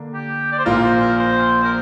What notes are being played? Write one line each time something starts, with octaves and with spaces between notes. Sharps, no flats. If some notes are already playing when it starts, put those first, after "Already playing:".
Already playing: D3 A#3 D4
G4
D5
C5
A#1 A#2 A#3 F4 A#4
C5
A#4
C5
A#4